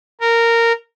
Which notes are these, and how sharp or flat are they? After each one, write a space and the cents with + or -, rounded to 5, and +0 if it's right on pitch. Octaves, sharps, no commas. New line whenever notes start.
A#4 -10